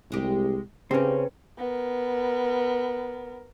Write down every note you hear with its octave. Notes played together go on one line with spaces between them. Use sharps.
C2 G#3 G4
C#3 C4 C#4 D#4 G4 B4 G5 A5
B3 A#4